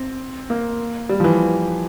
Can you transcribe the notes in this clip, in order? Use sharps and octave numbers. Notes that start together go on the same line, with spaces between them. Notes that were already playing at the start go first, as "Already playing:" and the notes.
Already playing: C4
A#3
G3
F3
E3